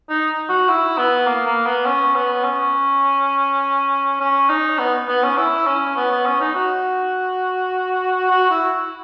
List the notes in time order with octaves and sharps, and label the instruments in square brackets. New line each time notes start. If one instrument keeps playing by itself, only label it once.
[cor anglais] D#4
F#4
E4
B3
A#3
A#3
B3
C#4
B3
C#4
C#4
D#4
B3
B3
C#4
E4
C#4
B3
B3
C#4
D#4
F#4
F#4
E4